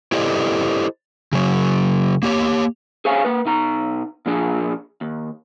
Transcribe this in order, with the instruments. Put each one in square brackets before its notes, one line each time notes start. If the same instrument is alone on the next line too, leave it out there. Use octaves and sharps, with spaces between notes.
[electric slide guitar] E4 G4 A4 C5 D5 D#5
C#3 F#3
A#3 G4 C#5
[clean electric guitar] G#4 C5 C#5 F5 G#5
A#3 B4
B2 D#4 A#5
A#2 F3 D4 G#4
D#2